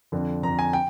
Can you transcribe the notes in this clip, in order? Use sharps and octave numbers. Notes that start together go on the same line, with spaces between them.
F2 D3 F3
F2 D3 F3 A#5
G#5
G5